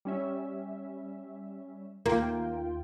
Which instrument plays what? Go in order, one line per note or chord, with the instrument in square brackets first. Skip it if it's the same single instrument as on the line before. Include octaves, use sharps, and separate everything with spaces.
[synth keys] G3 C#4 E5
[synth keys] D#2 F4 G5 [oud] A#3